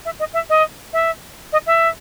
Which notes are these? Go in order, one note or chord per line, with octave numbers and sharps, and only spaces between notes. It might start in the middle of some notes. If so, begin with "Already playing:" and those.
E5
D#5
E5
D#5
E5
D#5
E5